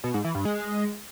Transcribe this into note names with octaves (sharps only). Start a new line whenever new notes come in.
B2
G#2
E3
G2
G#3